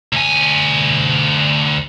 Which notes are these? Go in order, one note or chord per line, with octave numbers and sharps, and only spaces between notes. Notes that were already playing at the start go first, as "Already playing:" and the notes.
D2 G#5